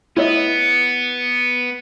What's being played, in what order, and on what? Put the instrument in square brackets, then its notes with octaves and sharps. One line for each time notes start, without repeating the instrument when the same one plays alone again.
[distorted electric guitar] B3 [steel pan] E4 C#5 D#5